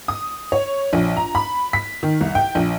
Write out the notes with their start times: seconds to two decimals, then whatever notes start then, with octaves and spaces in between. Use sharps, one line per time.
0.08 D#6
0.52 C#5
0.93 A#1
1.17 A#5
1.35 B5
1.73 B6
2.03 D#3
2.21 C2
2.35 G5
2.55 A#1